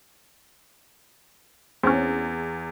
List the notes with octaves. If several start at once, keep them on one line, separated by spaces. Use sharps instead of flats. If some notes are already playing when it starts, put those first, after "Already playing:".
E2 C4 C#4